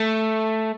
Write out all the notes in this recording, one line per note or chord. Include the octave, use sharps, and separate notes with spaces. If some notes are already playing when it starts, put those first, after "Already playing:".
Already playing: A3